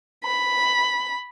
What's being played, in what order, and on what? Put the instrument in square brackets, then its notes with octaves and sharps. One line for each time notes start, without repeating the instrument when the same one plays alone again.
[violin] B5